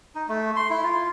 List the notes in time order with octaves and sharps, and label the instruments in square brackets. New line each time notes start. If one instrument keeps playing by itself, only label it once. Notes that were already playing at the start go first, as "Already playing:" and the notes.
[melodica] D#4
A3
C6
E4
F4